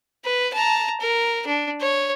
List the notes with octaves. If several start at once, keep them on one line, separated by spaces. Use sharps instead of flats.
B4
A5 A#5
A#4
D4
C#5